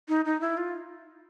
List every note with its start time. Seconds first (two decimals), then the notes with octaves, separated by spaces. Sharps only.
0.09 D#4
0.25 D#4
0.41 E4
0.57 F4